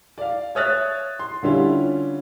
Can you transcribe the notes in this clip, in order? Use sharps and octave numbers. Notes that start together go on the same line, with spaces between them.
D5 F5
C#5 E5 D#6 F6 F#6 A6
C6
D3 G3 C#4 E4 F4